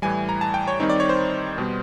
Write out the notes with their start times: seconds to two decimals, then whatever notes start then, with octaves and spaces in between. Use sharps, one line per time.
0.02 A2 E3 G3 G#5
0.29 A#5
0.41 A5
0.54 G5
0.68 C#5
0.80 D#3 G3 C4 D#4 C#5
0.90 D5
1.00 C#5
1.09 C5
1.58 B2 G3 B3